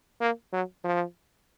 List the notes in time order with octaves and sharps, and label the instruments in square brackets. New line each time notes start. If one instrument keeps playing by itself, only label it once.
[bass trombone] A#3
F#3
F3